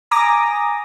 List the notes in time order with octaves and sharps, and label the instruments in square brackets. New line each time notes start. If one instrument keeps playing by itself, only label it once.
[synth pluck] G#5 A#5 D6 D#6 A#6